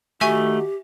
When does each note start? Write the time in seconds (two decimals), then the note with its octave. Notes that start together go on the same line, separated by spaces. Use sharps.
0.21 D#3 A3 D#4 F#4 G4 E5 G#5 C#6